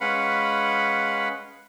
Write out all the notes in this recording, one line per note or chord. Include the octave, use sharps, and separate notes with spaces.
G#3 C#4 B4 F5 F#5 B5